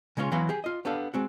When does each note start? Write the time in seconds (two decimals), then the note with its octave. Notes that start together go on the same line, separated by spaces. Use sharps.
0.17 C#3 G#3 C#4 F4 C#5
0.32 E3 F#3 B3 E4 F5 C6
0.49 G4 G#4
0.64 F4 D#5
0.85 B3 D4 G4 A4 F5
1.14 G#3 C4 F#4